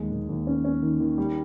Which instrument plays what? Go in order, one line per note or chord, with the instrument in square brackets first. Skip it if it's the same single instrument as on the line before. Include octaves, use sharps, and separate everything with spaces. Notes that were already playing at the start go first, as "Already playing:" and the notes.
Already playing: [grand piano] D#2 G#3
D#2
D#2
C#4
C#4
D#3
D#3
G3